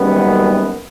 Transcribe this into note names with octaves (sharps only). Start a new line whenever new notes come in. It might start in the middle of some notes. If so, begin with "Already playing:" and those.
Already playing: F#1 F#2 D#3 G3 B3